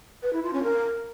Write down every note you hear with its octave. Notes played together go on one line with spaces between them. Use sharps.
B4
E4
F4
C#4
A#4